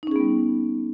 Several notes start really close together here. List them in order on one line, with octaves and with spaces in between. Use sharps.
D#4 C#4 G#4 B3 G3